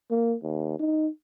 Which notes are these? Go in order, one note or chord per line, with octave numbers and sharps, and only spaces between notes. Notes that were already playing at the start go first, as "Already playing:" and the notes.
A#3
D#2
D#4